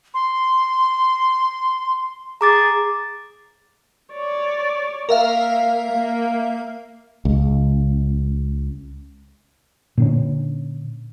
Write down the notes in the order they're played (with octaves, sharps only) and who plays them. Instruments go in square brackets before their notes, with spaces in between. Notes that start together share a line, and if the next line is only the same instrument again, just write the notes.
[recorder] C6
[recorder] G#4 [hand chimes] A#5 D6 A6
[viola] C#5 D5
[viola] A#3 [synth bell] A#4 E5 F5
[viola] A#3
[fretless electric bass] C#2
[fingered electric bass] A#2 D3 C#4